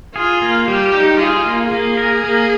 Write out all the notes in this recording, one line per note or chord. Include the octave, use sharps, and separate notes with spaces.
F4 G#4
A#3
G3 G4
D#4
F4 G#4
A#3
A#3 G#4
A#4
A#3